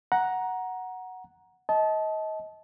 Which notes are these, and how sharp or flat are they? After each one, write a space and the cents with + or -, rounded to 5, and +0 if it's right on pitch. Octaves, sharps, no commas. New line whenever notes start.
F#5 +0 A#5 +10
D#5 +25 A5 -20